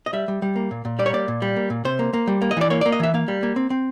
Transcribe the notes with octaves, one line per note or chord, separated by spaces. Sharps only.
D#5
G3 E5
G3
G3
A#3
A#2
A#2
G3 D5
C#5
A#3 D5
A#2
G3
A#3
A#2
C3 C5
A#3
A#3
G3
A#3
D#5
E3 D5
A#3 C#5
D5
A#3
D#5
E3 E5
A#3 F5
G3
A#3
C4
C4